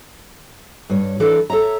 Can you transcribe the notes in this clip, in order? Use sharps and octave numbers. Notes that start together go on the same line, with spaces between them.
G2 C#5
E3 D4 A4 A#4 D5
A4 C#5 E5 A#5